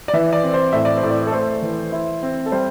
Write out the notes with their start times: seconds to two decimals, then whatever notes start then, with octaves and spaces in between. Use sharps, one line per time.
0.08 D5
0.13 E3 E5
0.33 D5
0.44 C4
0.54 C5
0.73 A2 E5
0.85 D5
0.98 C5
1.03 A2
1.10 D5
1.27 A4
1.33 A3 C5
1.62 E3
1.92 E4
2.23 C4
2.46 A4
2.52 G3 C5